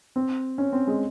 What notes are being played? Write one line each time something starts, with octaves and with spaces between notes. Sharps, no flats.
C4
C#4
C4
G#3